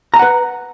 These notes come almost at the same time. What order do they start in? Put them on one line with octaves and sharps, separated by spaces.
A#5 G#5 F#5 B4